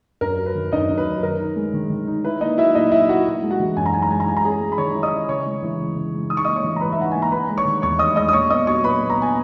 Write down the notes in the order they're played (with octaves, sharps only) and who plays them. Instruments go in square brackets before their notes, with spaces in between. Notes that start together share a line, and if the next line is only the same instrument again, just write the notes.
[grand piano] F#2 A#4
F#3
B4
D#3
F#2 D#4 D#5
F#2
B4
F#3
D#3 A#4
D#4
G#3
D#3
D#3
D#4
E4 B4
A#3 D#4 D#5
F#3 E4 E5
A#2 D#4 D#5
E4 E5
A#3 F#4 F#5
D#4
G#3
F#4 F#5
E3
F#2 G#5
A#5
D#4 G#5
A#5
G#3 G#5
A#5
E4 G#5
A#5
C#4 G#4 G#5
G#3
B5
D#3 C#5 C#6
E4
D#5 D#6
C#4
C#3 C#5 C#6
G#3
E3
C#3
C#3
G#3
D#4 D#6
C#6
A#3 D#5 D#6
C#5 C#6
E3
A#5
G#2 B4 B5
E5
D#4 F#5
A#3 G#5
A#5
D#4 B4 B5
G#3
C#5 C#6
D#3
E2 C#5 C#6
D#4 D#5 D#6
G#3 D#5 D#6
D#6
A#2 C#5 C#6
B3 D#5 D#6
F#3 C#5 C#6
A#2 B4 B5
A#2
A#5
B3 G#5